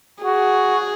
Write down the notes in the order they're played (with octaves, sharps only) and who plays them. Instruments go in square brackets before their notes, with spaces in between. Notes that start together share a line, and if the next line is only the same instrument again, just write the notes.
[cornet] F#4 [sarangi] G#4